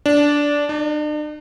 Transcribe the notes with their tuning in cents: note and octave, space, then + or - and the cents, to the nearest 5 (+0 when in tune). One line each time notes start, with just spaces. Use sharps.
D4 -10
D4 +45